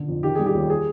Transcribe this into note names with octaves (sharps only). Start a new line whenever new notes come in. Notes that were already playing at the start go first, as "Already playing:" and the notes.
Already playing: D3 D#3
F2
D#3 G4
G3 G#4
G4
D#2
G#4